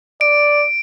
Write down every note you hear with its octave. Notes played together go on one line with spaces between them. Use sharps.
D5 D7